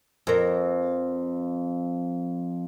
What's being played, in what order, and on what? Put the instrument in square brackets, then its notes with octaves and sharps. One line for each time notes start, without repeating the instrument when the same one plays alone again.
[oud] F2 A#4